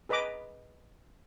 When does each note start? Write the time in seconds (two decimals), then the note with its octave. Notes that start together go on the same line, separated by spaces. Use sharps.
0.09 G#4 B4 D#5 B5 D6